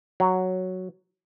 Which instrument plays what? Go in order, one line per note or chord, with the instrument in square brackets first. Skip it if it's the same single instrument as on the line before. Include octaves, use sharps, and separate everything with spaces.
[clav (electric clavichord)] F#3